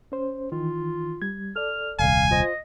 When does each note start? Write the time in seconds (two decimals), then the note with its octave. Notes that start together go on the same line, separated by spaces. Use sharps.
0.12 C#4 C5
0.52 D#3 E3 F4
1.22 G3 G#6
1.56 A4 D5 F6
1.99 D#1 C2 F5 G#5
2.31 F4 C5 D#5